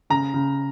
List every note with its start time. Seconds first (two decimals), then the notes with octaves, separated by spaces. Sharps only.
0.10 C#3 A#5
0.34 C#3